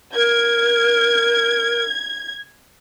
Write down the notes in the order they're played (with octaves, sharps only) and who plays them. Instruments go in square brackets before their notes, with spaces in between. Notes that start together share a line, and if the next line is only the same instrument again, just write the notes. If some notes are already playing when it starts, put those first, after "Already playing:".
[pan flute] A#4 [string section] G#6